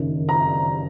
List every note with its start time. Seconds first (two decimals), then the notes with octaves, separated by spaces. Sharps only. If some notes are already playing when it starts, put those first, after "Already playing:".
Already playing: F#1 F#2 D#3
0.29 A#5